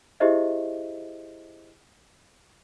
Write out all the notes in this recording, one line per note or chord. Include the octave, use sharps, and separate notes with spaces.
E4 G4 G#4 C5 D#5 E5